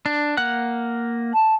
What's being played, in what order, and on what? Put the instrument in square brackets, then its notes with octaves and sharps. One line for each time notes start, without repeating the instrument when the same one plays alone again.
[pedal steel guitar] D4
A#3 F#5 F#6
[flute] A5